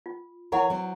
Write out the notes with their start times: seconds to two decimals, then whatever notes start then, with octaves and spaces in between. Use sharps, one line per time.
0.06 F4
0.52 E3 E4 A#4 C#5 F#5 A#5
0.70 F#3 C4